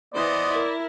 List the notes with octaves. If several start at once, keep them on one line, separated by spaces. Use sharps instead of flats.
E3 B3 C5 D5 D#5
E4 A#4